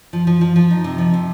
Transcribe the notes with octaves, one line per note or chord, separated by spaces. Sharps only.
F3
F3
F3
F3
D#4
C3
F3
C3